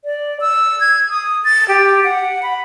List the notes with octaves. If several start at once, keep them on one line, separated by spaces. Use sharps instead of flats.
D5
E6
G#6
D#6
A6
G4
F#5
B5